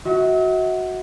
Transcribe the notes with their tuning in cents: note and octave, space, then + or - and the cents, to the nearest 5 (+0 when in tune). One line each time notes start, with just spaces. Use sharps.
F#4 +0 E5 -45